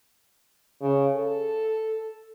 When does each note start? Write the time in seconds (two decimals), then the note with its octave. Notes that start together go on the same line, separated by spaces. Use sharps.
0.81 C#3
1.16 A4